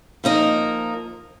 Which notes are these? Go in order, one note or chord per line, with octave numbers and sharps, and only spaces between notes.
F3 A#3 D#4 A#4 D#5